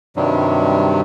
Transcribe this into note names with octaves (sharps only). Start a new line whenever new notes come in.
G2 C3 D#3 F#3 G3